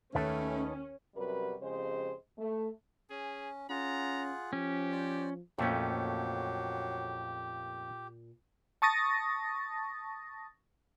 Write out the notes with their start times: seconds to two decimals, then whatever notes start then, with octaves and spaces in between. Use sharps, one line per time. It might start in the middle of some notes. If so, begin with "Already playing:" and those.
0.15 D#2 D#3 A3 C#4 B4 A5
1.16 F#2 C3 G3 F#4 A#4 B4
1.61 F2 C#3 G#3 G4 G#4 C5
2.38 A3
3.10 C#4 G#4
3.70 C#4 F4 G#4 F#5 A#5
4.53 F3 C#4 G4
4.91 C5 D5
5.58 F2 A#2 F#3 A3 A#3 C#4 G4
8.82 A5 C#6 D#6 A6 A#6